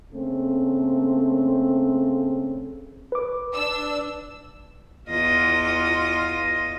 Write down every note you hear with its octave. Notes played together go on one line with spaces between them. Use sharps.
C#3 A3 A#3 C4
B4 D6
D4 E6
E2 F4 D#5